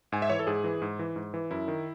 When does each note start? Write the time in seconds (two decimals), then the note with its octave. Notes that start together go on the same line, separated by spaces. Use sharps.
0.12 G#2 G#5
0.22 E5
0.30 E3 C#5
0.39 A4
0.47 G#2 G#4
0.64 E3
0.82 G#2
0.99 E3
1.16 G#2
1.34 E3
1.51 F#2 E4
1.68 D#3